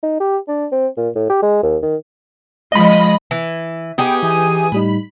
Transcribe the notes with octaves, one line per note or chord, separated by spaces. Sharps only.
D#4
G4
D4
C4
A#2
A2
G4
G#3
D#2
D#3
F3 G#3 D#5 B5
E3
B3 D#4 G4 G#4 G5
E3 G#5 D#6
A2 G3 D#4 B5